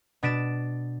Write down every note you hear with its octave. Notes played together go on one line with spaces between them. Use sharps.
B2 D4 A6 B6 D7 E7